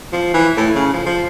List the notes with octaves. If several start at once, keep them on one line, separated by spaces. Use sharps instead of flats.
F3
E3
A2
C#3
F3
F3